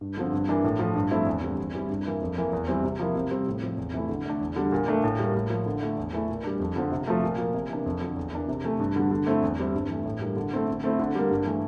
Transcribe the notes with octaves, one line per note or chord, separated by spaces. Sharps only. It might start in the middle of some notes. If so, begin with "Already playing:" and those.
G2
D3 F3 C4
G2
E3 A#3 D4
A2
F3 A3
G2
F3 A3 C4 E4
E2
D3 G3 C4
E2
E3 G3 C4 E4
G2
E3 A#3 E4
F2
E3 A#3
E2
E3 G3 C4
C3
F3 A#3 E4
C3
G3 C4
A2
F3 C4
E2
C3 E3 A3 E4
D3
A3 D4
E2
D3 G3
A#2
A3 D4
A2
G3 A#3
A2
F3 A#3
D3
A3 E4
E2
E3 A3 E4
A#2
G3 D4
F2
D3 F3 C4
C3
F3 A3
A#2
F3 A#3
C3
E3 A#3 D4
F2
D3 F3
E2
E3 A#3 D4
C3
E3 A3
G2
D3 G3
D3
A3 C4 E4
E2
E3 G3 C4 E4
G2
E3 A3
A2
G3 A#3 D4
D3
A3 C4 E4
D3
A3 C4 E4
D3
G3 A#3
G2
E3 A3